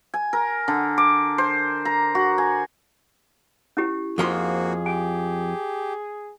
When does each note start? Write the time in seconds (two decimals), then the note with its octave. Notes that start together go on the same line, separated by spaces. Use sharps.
0.14 G#5
0.33 A#4
0.68 D3
0.98 D6
1.38 C5
1.85 A#5
2.15 F#4
2.38 G#5
3.77 C#4 E4 G4
4.18 F2 F3 A#3 F#4 G#4 C6
4.86 G4 G#5